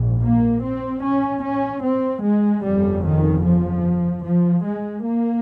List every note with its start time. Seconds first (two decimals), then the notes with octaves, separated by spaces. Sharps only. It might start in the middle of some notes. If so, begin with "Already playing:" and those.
Already playing: A#1 G#2
0.23 A#3
0.62 C4
1.04 C#4
1.44 C#4
1.83 C4
2.23 G#3
2.63 G1 F2 C#3 G3
3.04 D#3
3.44 F3
4.25 F3
4.65 G#3
5.05 A#3